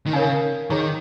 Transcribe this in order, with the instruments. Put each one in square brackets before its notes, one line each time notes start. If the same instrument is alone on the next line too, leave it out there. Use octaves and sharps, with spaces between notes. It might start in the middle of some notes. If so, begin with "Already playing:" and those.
[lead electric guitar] D#3
[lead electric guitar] C#3 [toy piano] A#4 C#5 F5 G#5
[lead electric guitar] D#3 [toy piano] G#4 C#5 A#5 C#6